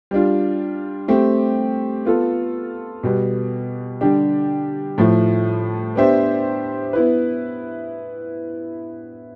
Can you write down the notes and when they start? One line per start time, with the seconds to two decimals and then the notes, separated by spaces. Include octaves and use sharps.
0.11 G3 D4 F4
1.08 A3 C4 G4
2.05 B3 F4 A4
3.03 B2 G3 B3
4.01 D3 G3 D4 G4
4.98 A2 F3 A3
5.96 B3 D4 G4 C5 E5
6.93 B3 E4 B4